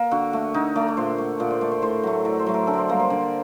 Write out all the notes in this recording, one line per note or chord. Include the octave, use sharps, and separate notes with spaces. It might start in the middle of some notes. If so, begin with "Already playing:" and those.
Already playing: A#3
D3 F#4
A3
D3 D#4
A3 D5
D5
A#2 C5
A3
A#2 D5
C5
A3 D5
C5
A2 C5
F#3 A3
A2 D5
C5
F#3 A3
A#4
D3 A4
C5 D5
G3 A#3 A#4
C5
D3 D5